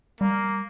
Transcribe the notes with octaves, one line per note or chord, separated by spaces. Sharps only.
G3 A#3